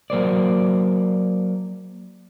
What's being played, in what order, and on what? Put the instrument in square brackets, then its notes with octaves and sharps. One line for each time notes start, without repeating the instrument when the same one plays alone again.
[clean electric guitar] F#3 A#3 C5 D5